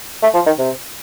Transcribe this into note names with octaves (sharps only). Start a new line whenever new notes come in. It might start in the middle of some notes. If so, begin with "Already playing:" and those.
A3
F3
D#3
C3